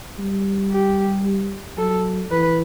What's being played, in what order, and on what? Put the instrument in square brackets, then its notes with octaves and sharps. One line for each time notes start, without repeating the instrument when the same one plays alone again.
[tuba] G3
[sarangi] G4
[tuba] F#3 [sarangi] A4
[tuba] E3 [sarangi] B4